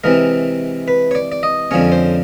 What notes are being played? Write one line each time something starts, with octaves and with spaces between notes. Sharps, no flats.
C3 E3 G#3 A#4
B4
C#5
D5
D5
D#5
F2 D3 F3 G#3 C#4 C#5
C5